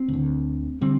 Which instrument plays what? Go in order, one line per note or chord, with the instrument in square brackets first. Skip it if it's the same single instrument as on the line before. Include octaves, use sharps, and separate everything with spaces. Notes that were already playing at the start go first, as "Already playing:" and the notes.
Already playing: [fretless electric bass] C4
D2
D3
D3 G3 C4